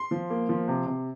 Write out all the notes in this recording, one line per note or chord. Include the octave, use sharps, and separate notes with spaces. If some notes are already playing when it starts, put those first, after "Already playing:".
Already playing: C6
F3
A#3
F3
C3
C3